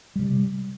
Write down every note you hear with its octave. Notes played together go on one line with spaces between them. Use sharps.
C3 G3